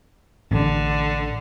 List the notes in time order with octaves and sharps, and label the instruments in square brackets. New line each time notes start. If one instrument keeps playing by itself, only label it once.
[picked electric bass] A1 [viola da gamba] D3